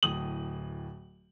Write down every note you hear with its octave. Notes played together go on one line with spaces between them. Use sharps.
D1 A2 D#6 F#7